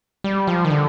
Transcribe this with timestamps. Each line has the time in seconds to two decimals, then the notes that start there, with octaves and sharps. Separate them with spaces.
0.24 G3
0.47 F3
0.65 D#3
0.70 D3